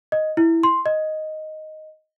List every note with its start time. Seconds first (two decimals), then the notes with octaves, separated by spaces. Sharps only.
0.12 D#5
0.37 E4
0.63 C6
0.86 D#5